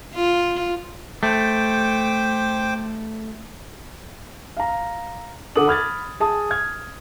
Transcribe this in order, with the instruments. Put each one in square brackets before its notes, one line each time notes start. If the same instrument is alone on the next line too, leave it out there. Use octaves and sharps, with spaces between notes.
[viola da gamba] F4
[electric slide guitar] A3 [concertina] C5 G5 D6
[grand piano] F5 A#5
D3 A4 F#5 D6 D#6 F#7
B5 F6 G#6 A6
G#4 A5 D#6
F6 G#6